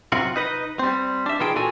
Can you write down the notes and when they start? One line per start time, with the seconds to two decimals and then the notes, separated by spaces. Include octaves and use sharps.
0.12 C3 F#3 F4 F#4
0.36 D#4 B4 D#5
0.79 G3 C4
1.26 D4 E5
1.40 B2 E3 D#4 F4 G#4 G5
1.55 A#2 F4 F#4 A4 G#5